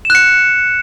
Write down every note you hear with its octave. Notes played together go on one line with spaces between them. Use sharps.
F#6 C#7 E7